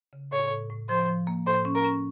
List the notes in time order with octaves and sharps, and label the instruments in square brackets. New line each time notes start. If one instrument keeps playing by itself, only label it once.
[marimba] C#3
[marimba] A2 [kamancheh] C#5
[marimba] A2
A2
[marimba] F3 [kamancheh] C5
[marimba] F3
A#3
[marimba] A2 [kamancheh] C5
[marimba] C#4
[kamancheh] A#4
[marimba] C#4